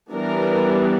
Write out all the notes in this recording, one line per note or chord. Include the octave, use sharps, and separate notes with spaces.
E3 G3 B3 D4 A#4